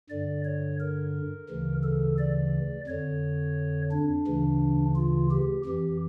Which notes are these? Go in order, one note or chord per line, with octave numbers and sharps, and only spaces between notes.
G2 D3 D5
C#5
A#4
D2 C#3 E3
A4
D5
F2 D3 C#5
D4
D2 C#3 E3
F4
G4
F2 E3 G4